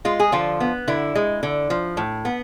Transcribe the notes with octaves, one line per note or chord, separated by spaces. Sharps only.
G#3 F4
G#4
D3 F3 F4
B3
D3 E4
G#3
D3
F3
A2
B3